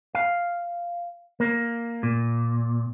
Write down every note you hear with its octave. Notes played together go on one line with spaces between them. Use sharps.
F5
A#3
A#2